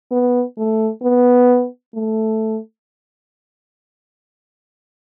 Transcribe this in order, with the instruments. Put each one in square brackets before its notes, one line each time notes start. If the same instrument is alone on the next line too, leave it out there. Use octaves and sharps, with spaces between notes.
[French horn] B3
A3
B3
A3